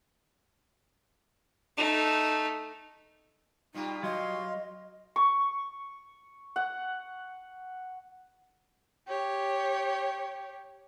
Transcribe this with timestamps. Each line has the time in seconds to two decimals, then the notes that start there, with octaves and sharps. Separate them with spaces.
1.77 A3 D#4
3.74 B2 G3 D#4 F4
4.03 F#3 D#5 F5 C6
5.16 C#6
6.56 F#5
9.08 G4 C#5